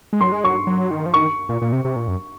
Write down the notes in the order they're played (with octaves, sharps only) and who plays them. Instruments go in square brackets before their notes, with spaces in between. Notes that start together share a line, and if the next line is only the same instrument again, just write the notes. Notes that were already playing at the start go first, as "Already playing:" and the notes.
[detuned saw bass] G#3
[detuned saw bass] F#3 [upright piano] C6
[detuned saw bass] G#3
[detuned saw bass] F#3 [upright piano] C#6
[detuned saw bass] F#3
D#3
F3
[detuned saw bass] D#3 [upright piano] C#6
[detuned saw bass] A#2
A#2
C3
C3
A#2
F#2